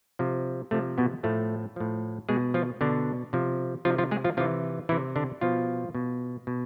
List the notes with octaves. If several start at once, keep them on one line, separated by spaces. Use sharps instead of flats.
C3 F3
C3 F3 A3
B2 B3
A2 F3 A3
A2 F3
B2 G#3 G#4
F3 F4
B2 D3 D4
C3 F3
C3 F3 F4
F3 F4
G#3 G#4
F3 F4
C3 E3 F3 F4
C3 E3 E4
D3 D4
B2 F3 F4
B2
B2